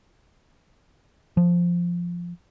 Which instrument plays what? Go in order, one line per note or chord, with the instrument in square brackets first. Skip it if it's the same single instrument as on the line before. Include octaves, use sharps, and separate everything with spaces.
[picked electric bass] F3